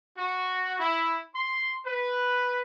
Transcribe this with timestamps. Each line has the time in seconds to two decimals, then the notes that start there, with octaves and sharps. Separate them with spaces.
0.17 F#4
0.79 E4
1.35 C6
1.86 B4